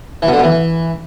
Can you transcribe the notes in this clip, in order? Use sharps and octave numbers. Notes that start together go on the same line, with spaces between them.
E3
B2
D3
B2
E3